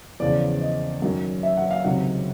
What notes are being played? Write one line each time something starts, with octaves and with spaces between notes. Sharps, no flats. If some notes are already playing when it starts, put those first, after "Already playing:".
E2 C#3 F3 D5
D#5
F#2 D#3 F#3
E5
F#5
F5
C#2 C3 D#3 F#3 F#5